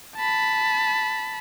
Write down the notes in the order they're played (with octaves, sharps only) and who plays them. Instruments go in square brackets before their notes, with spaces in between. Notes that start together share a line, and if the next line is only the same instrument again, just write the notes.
[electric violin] A5 B5